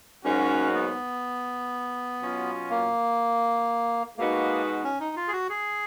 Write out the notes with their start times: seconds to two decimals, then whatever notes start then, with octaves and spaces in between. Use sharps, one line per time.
0.24 G#2 F#3 A#3 C#4 D#4 F#4
0.74 B3
2.22 B2 F#3 C#4 F4
2.70 A#3
4.18 B2 G#3 A#3 B3 D#4 F#4
4.84 C#4
5.00 D#4
5.16 F4
5.28 G#4
5.33 F#4
5.49 G#4